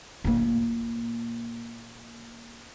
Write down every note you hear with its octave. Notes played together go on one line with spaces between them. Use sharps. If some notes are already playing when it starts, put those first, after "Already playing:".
A#2 A#3